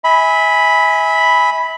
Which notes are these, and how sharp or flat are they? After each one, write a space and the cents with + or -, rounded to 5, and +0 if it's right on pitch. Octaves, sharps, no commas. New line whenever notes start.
E5 -35 G#5 +0 B5 +0